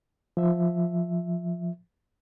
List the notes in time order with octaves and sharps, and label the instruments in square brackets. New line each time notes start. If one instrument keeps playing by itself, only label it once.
[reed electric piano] F3 E5